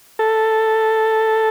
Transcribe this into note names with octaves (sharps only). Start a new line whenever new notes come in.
A4